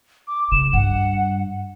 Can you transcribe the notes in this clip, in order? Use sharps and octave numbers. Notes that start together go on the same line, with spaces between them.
D6
C#3 E7
G2 F#5